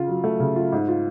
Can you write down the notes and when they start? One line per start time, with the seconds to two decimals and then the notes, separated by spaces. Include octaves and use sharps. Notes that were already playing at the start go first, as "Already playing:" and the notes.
Already playing: C#3 F4
0.08 F#3
0.24 A3
0.40 C#3
0.56 F4
0.72 G#2
0.88 F4